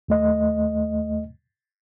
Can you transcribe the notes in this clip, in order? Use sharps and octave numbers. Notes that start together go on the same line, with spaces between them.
D#2 A3 D#5